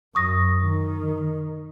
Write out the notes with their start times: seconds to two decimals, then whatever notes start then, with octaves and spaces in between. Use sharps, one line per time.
0.15 F#2 C#6 D#6 A#6
0.61 D#3